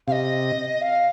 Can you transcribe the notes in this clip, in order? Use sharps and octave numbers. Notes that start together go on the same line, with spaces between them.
C3 D#5 F5
F5